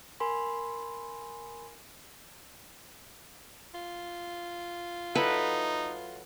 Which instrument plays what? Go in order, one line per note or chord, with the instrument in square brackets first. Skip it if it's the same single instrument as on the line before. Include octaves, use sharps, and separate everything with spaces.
[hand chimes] A#4 G#5 B5 C6
[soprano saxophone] F4
[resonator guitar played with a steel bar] F#3 E4 A4 [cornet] D#4 [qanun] B4